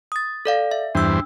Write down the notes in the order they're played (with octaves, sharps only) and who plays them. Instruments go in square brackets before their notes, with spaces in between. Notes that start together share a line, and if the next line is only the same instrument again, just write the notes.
[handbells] D#6 A6
A4 D5 F5
E5
[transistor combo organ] E2 G2 C5 [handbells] D4 E6